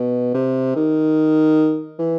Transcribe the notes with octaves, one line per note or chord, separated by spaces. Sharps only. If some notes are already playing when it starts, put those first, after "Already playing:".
Already playing: B2
C3
D#3
E3